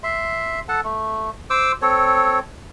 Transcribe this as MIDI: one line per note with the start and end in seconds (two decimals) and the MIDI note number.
0.03 0.60 76
0.03 0.60 84
0.68 0.81 69
0.68 0.81 78
0.68 0.81 81
0.84 1.30 57
1.50 1.72 72
1.50 1.72 86
1.50 1.72 88
1.82 2.40 60
1.82 2.40 69
1.82 2.40 73